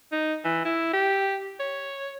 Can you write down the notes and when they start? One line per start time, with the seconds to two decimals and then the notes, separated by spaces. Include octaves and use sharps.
0.12 D#4
0.45 E3
0.65 E4
0.93 G4
1.60 C#5